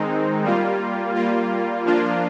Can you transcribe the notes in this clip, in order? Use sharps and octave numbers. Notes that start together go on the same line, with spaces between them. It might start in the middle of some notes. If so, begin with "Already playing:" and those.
Already playing: D#3 G#3 C4 D#4
G3 A#3 F4
G3 A#3 F4
F3 A#3 D4 F4